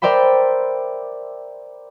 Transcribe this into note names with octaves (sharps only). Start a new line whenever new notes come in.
A#4 C5 D5 E5 G5 B5